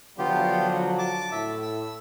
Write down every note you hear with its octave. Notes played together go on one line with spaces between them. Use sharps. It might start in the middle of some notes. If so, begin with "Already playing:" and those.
D3 F3 F#3 B3 F4 G4
A5 D6
A2 E5
E6